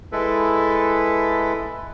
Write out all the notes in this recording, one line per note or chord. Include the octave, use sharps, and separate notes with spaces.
G#3 E4 A4 B4